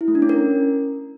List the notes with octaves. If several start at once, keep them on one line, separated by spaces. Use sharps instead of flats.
E4
A3
D4
C#4
A#4